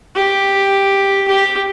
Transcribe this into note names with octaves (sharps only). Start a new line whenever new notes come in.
G4
G4